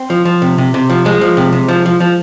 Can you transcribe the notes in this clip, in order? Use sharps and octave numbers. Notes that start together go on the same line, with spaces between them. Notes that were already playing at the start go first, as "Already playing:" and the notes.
Already playing: C4
F3
F3
C3
C3
C3
F3
F3 G#3
F3
C3
C3
F3
F3
F3